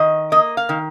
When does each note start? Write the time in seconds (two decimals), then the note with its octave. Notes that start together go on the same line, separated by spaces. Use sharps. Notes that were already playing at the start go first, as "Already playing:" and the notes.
Already playing: D#3 D#5
0.32 A#3 D#5
0.57 F5
0.69 D#3